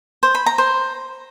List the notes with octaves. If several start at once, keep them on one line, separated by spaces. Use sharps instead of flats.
C5
B5
A#5
C5